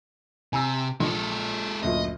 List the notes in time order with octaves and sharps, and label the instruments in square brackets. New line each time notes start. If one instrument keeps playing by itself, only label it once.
[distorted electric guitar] C3 [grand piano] G#5 A#5 E6
[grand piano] A#1 [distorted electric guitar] G#3 A4
[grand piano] F#1 D2 A#2 [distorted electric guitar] D#5